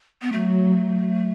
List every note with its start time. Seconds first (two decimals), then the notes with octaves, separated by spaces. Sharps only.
0.22 B3
0.32 F#3 A3